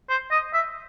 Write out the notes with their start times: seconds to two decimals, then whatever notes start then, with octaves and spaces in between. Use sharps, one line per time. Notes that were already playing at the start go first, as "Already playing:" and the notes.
0.09 C5
0.31 D#5
0.53 E5